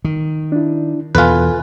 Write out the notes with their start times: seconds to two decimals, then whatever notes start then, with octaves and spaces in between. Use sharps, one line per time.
0.05 D#3
0.52 D4 E4
1.15 E2 B2 F4 A4 B4 G#5